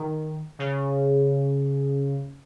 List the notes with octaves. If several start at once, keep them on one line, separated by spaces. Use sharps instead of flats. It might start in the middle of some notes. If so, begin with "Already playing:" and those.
Already playing: D#3
C#3